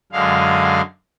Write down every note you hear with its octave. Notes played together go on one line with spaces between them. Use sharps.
F#2 D3 G#3 F5